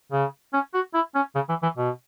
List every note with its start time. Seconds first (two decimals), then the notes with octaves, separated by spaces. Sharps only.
0.12 C#3
0.53 C#4
0.74 F#4
0.94 E4
1.15 C#4
1.35 C#3
1.49 E3
1.63 E3
1.77 B2